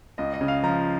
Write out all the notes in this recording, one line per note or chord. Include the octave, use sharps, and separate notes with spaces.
C#2 D#5
D#5
C#3
F5
F3 A#5